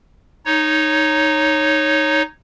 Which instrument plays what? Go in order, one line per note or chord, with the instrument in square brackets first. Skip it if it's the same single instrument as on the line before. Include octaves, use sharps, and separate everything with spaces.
[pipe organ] D#4 C#5